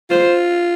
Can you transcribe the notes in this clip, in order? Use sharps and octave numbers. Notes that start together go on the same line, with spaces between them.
F4 C5